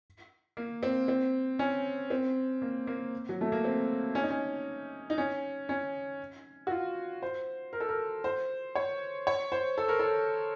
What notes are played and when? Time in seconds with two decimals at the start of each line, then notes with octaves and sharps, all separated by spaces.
0.57 A#3
0.83 C4
1.08 C4
1.59 C#4
2.10 C4
2.62 A#3
2.87 A#3
3.29 F#3
3.41 A3
3.52 A#3
3.64 C4
4.15 C#4
4.23 D#4
4.30 C#4
5.10 D#4
5.18 C#4
5.69 C#4
6.67 F#4
6.71 F4
7.22 C5
7.73 A#4
7.80 A4
7.89 A#4
8.24 C5
8.75 C#5
9.27 C#5
9.52 C5
9.78 A4
9.88 A#4
9.99 A4